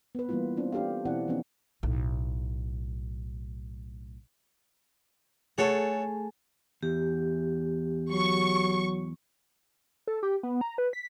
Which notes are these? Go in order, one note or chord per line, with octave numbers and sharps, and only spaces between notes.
B3 B4
E3 G3 A#3 B3 E4 F4
C4 D4 F4
D4 G4 A4 F5
B2 E3 C4 E4 D5 F#5
E3 F3 B3 C#4 D#4
B1 A2
A3 G#4 A4 C#5 F#5 A5
E2 G4
F#3 C#6
A4
G4
B3
A#5
B4
B6